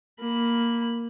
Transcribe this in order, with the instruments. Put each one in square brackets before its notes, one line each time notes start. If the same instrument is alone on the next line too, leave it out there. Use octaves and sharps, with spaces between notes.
[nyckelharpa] A#3 B5